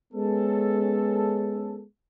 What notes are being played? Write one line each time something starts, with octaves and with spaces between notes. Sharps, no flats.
G#3 B3 C#4 A4